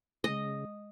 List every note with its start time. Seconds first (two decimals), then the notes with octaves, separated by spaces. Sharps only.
0.24 C#3 G#3 D#5